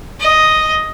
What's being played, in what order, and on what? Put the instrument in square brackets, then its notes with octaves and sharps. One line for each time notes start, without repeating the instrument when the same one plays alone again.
[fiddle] D#5